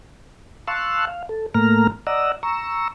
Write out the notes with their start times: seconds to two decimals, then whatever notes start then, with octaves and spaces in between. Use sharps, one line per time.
0.68 F5 A5 C6 C#6 E6 F#6
1.07 F5
1.29 A4
1.54 A2 A3 A#3 A#5 F6
2.07 D5 D#5 F#5 A#5 E6
2.43 A#5 C#6 E6